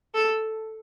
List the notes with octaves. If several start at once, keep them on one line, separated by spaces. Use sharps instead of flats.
A4